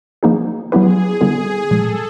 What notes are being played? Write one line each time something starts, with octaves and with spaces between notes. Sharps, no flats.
F3 A#3 D#4 G#4
F#3 B3 E4 G4 G#4 B4
D3 G3 B3 E4 G#4 A4
A#2 F3 G#3 A4